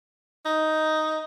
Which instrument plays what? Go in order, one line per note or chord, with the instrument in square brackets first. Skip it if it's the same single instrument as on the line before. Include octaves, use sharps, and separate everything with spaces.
[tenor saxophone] D#4